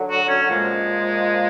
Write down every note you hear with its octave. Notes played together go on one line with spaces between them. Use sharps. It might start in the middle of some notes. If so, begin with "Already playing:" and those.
Already playing: D3 F#3
F#4
C#4
A#2 F3 G#3